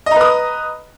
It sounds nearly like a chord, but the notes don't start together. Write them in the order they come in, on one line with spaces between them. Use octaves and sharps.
D#5 A#5 B4 D#6